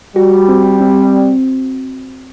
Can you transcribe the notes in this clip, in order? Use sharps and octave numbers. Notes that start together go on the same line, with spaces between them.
G3 F#4
C4
C4